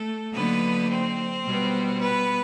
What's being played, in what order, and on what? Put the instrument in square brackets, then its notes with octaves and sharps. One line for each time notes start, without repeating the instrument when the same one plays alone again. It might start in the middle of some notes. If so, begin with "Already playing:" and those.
Already playing: [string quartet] A3 A4
D3 F#3 A#3 B3 D#4 B4
C4 C5
B2 G3 B3
B3 B4